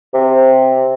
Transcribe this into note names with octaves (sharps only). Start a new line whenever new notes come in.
C3